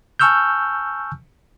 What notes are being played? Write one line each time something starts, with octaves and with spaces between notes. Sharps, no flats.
G#5 A5 C#6 E6 F6 G6